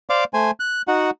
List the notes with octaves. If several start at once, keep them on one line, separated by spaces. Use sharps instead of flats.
C5 D5 F5 D6
A3 C5 G#5
F#6
D#4 F#4 F#5